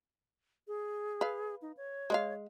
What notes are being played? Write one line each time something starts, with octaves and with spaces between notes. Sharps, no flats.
G#4
B4 F5
D#4
C#5
G#3 D5 F5